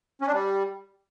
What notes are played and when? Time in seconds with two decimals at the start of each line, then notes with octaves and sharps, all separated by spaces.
0.21 C#4
0.27 D4
0.32 G3